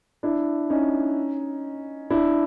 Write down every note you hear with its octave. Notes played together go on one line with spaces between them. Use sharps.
D4 E4
C#4 D#4
D4 E4